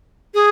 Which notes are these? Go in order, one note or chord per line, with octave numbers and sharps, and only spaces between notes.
G#4